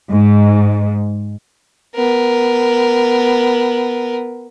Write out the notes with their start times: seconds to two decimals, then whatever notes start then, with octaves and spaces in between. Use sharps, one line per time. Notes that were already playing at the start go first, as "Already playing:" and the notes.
0.10 G#2
1.95 B3 A#4